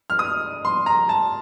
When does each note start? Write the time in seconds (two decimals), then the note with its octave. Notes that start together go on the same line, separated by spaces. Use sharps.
0.10 F6
0.19 D#6
0.65 C6
0.86 A#5
1.09 A5